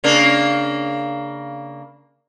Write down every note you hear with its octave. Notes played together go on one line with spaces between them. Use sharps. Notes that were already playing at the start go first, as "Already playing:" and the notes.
C#3 A#3 D4